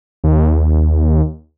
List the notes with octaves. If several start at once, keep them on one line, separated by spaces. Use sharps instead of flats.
D#2